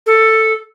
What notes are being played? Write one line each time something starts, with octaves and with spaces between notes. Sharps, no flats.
A4